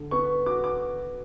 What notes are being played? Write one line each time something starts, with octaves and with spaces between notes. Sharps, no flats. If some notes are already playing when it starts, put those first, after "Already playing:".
Already playing: D3
B3 C#6
F#4 D6
D6